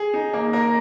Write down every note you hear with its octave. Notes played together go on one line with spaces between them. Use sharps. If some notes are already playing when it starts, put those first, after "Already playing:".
Already playing: G#4
D#4
A#3
A#3 A#4